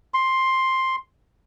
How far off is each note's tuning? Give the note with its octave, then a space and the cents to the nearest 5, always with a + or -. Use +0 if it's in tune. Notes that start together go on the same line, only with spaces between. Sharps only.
C6 +10